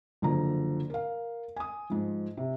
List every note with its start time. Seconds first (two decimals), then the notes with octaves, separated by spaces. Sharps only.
0.22 F#1 D3 F3 A#5
0.90 A#4 F5
1.56 G#5 D#6
1.90 G#2 F3
2.37 C3